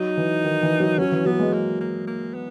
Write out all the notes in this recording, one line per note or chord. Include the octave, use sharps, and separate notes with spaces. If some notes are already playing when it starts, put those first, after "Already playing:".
Already playing: F#3 D#4
E3
D#3
E3
F#3
F#3 C#4
E3
F#3 B3
G#3
A#3
A#3
A#3
B3